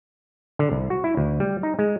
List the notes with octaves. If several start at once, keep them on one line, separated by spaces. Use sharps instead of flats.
D3
C2
F#4
E4
D2
G3
D#4
G#3